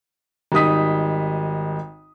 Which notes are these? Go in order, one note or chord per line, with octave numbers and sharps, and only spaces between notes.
G#1 G3 D#4 D#6 B6